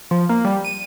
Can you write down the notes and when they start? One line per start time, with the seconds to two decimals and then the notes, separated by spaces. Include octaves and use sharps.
0.11 F3
0.29 A#3
0.45 G3
0.65 D#7